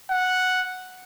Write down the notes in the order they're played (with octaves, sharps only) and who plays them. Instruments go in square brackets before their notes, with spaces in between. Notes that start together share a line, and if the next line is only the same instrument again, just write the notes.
[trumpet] F#5